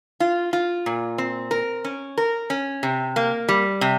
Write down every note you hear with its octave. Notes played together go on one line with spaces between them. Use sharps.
F4
F4
A#2
C4
A#4
C#4
A#4
C#4
C3
A#3
G3
C3